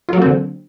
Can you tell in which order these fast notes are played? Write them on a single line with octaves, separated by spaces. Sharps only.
F4 F#3 A#3 C4 D3